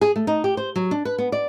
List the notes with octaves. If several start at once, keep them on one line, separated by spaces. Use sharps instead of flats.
G#4
A3
D#4
G4
C5
F#3
D4
B4
B3
D5